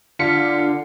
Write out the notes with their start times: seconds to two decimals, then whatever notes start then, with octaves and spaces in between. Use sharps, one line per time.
0.19 D3 F4 B6 C#7